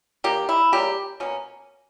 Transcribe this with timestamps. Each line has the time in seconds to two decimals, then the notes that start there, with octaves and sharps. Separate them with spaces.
0.24 D#3 A#3 G4
0.49 E4
0.72 C#3 G3 A#3 G4
1.20 B2 A#3 C#4